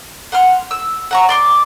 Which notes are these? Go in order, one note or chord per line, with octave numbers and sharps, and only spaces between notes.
F#5 C6 F6
E6
F#5 A#5 C#6
D5 C6 D6